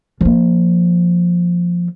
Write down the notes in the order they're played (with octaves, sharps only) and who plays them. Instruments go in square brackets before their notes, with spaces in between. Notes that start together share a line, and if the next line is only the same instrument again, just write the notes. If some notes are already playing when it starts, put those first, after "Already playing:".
[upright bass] F3 A#3